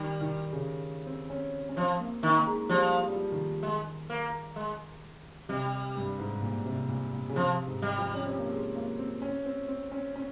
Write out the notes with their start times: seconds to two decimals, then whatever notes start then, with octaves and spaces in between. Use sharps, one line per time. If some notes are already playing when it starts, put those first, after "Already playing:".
Already playing: D#3 G3
0.21 D#3
0.53 C#3
1.06 C4
1.30 C#4
1.69 C#4
1.76 F3 C4
2.00 A#3
2.23 D#3 A#3
2.38 A#3
2.47 G#3
2.69 F3 G3
3.01 F3
3.09 G3
3.15 F3
3.32 D#3
3.63 G#3
4.10 A#3
4.56 G#3
5.49 C3 G3
5.96 G2
6.19 G#2
6.42 A#2
6.65 C3
6.89 A#2
7.13 A#2
7.29 C#3
7.36 C3 F3
7.67 G#2
7.82 G3
7.98 F3
8.14 C#4
8.27 C4
8.39 A#3
8.52 G#3
8.76 A#3
8.99 C4
9.22 C#4
9.46 C4
9.68 C4
9.92 C#4
10.16 C#4